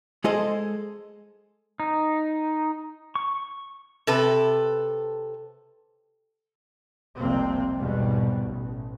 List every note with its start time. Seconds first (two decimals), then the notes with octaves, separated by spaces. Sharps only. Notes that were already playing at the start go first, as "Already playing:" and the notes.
0.24 G#3 G#4 A4 C5 D#5
1.80 D#4
3.15 C#6
4.07 C3 A4 B4
7.18 F1 C2 F2 C3 A#3 C4
7.77 B1 E2 G#2 B2 G3
8.44 A1